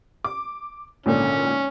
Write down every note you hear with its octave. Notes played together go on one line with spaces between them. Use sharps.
D6
G#1 A#2 D3 C#4